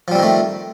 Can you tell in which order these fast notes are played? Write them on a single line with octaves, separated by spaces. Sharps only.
F3 G3 C4 D#3 A3